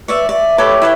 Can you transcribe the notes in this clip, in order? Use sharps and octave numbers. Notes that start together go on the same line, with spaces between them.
B4 C#5 D5 E5
D5 E5
A3 G4 A4 B4 C#5 D6
E4 B4 G5